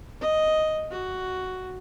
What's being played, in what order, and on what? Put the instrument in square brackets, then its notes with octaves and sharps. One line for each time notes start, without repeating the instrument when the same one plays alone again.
[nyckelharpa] D#5
F#4